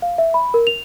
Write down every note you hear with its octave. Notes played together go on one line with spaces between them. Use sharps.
F5
E5
B5
A#4
F7